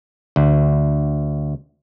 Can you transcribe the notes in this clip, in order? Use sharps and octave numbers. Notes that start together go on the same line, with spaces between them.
D2